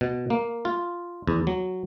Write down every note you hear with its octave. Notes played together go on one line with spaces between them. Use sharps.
B2
A#3
F4
E2
F#3